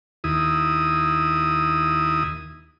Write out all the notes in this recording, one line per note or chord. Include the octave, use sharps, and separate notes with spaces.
D#2 E4 D#6